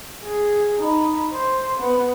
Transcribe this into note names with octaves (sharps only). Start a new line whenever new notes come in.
G#4
D#4 B5
C5
B3